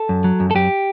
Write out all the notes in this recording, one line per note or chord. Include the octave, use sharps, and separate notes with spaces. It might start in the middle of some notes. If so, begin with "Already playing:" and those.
Already playing: A4
F#2
F#3
F#2
A4
F#2 G4